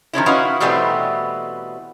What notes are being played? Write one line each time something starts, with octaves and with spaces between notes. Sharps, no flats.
D#3 F3 C#4 E4
C#4 D#4 E4 F#4 B4 F5
B2 E3 G3 A3 B3 C4